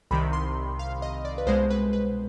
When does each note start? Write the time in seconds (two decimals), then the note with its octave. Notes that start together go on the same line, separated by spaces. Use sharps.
0.11 C2 C3 D#3 B5
0.33 C6
0.79 F5
1.02 D#5
1.25 D5
1.38 B4
1.47 C2 B2 G#3 C5
1.70 B4
1.93 B4